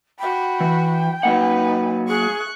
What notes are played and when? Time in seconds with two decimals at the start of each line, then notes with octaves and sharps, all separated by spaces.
0.19 F#4 G5 B5
0.60 E3
1.23 F#3 A#3 D#4 B4 F#5
2.08 G#4 C#6 F#6